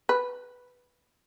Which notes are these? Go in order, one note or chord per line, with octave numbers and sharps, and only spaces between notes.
B4